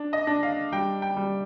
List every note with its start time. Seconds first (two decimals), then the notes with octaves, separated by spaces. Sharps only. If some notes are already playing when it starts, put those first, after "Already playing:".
Already playing: D4
0.13 D#5
0.27 D4
0.43 F5
0.72 G3 G5
1.02 G5
1.17 G3